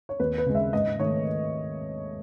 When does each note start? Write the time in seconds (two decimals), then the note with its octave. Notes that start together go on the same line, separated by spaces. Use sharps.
0.09 C#5
0.20 D#2 B4
0.38 B4
0.46 C#3 G#3
0.55 E5
0.73 G#2 D#5
0.99 D#3 A3 C#5